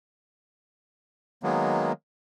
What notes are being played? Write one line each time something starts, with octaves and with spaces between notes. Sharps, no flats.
D#3 F#3 G#3 A#3 B3